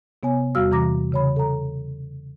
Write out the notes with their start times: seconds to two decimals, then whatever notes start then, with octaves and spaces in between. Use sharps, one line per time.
0.23 C3 B3 C#5 G#5
0.55 E2 G3 F#4 F5 E6 F6
0.71 C3 E3 A#5 D6 A#6
1.12 C#3 C#5 B5
1.36 A4 A#5